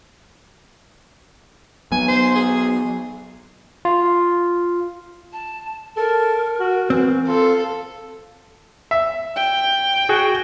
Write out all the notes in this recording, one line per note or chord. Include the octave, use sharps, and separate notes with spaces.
F#3 B3 G#5
C5
G#4
F4
A5
A4 A#4
F#4
E3 C4
F4 A4 F5
E5
G5
F#4 G#4